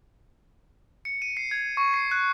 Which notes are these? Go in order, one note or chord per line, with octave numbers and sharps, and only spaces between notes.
C#7
D#7
C7
G#6
C#6
C7
F#6